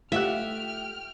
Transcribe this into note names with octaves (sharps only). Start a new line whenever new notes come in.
A3 F4 G4 D5 E5 F#5 G5 F6